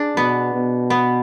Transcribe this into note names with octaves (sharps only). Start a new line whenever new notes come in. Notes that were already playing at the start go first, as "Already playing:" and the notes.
Already playing: D4 G#4
B2 B3
B2
B3